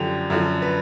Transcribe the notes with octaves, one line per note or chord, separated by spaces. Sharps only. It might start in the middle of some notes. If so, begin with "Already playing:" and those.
Already playing: F#2 D3 F3 G4
F#2 D3 F3
B4